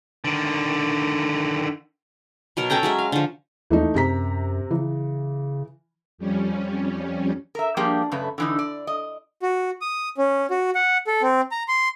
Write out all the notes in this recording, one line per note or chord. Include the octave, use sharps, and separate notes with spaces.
D3 D#3
B2 F#3 A#4
C#4 A4 G5 A#5
F#3 G#3 E5
F5
D3 F3
D#2 E3 A3 D#4
F#2 C3 A#5 B6
C#3 E3
F2 G3 C#4
A#4 E5
F3 G3 A#3 D4 G4 G#4
F#2 C#3 A3 B4
D3 E3 D#4
D5
D#5
F#4
D#6
C#4
F#4
F#5
A4
C4
A#5
C6